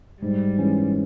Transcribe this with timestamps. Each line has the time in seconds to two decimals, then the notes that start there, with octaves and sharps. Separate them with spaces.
0.22 G#2 G3
0.58 E3 G#3 C#4